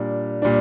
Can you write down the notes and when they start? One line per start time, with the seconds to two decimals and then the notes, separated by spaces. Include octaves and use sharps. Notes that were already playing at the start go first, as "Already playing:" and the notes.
Already playing: A#2 G3 D4
0.42 A#2 G3 D4